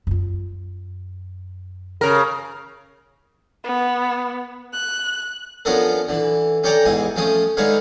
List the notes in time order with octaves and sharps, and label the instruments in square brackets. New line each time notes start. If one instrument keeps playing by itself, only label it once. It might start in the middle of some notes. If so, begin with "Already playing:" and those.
[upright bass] F#2 F4
[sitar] C#3 A#4
[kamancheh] B3
F#6
[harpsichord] F3 B3 C#4 D4 A4 A#4
D3 E3
C#4 G4 A4 D5 G5 A#5
E2 G#2 E3 G#5
F3 A3 C4 C#4 D#6
D3 G#3 D#4 B4 C#5 F5